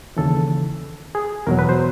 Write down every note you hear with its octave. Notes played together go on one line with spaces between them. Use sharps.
D#2 C#3 E3 A4
G#4
E2 B2 F#3 A#4
B4
C5